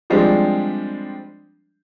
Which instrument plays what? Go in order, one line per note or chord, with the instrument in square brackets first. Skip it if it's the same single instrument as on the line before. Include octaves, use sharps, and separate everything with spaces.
[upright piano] F3 G3 G#3 C4 D4 G4